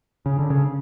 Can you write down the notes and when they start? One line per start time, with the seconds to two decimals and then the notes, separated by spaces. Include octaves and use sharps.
0.26 C#3
0.39 D3
0.50 C#3